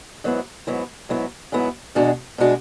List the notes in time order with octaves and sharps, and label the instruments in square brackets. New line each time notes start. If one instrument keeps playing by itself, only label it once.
[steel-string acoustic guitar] G#2 F#3 B3 E4
G#2 F#3 B3 E4
G#2 F#3 B3 E4
G#2 F#3 B3 E4
E2 B2 G#3 D4 F#4
B2 G#3 D4 F#4